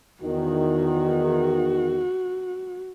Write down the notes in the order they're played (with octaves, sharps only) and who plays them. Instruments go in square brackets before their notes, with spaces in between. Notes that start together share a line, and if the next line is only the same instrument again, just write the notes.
[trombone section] E2 D#3 [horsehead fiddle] F#4